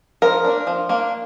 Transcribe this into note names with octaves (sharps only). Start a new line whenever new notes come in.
F3 A#4
A#3 D4
F3
A#3 D4